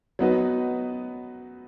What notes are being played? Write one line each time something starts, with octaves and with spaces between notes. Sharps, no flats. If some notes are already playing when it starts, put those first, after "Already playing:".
F#3 B3 D#4 F#4 B4